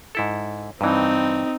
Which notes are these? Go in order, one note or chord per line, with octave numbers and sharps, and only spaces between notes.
G#2 E4 A4
G2 E3 C4 D#4